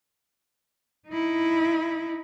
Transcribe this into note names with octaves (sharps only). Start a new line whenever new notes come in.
D#4 E4